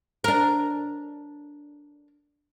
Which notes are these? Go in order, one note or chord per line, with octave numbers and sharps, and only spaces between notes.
D4 A#4